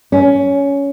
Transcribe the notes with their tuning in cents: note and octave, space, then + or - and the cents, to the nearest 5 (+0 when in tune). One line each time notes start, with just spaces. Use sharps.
C#4 +15